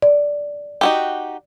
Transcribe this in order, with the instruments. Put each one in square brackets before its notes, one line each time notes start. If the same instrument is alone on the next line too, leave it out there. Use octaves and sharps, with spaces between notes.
[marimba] D5
[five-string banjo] D#4 F#4 G4